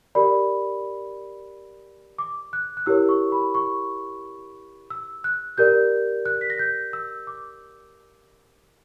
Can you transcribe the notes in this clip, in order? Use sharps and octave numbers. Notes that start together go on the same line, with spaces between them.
G4 A#4 D5 B5
D6
F#6
F#6
E4 G4 A#4 C#5 E6
C#6
B5
C#6
E6
F#6
G4 A#4 D5 G6
F#6
B6
A#6
G6
E6
D6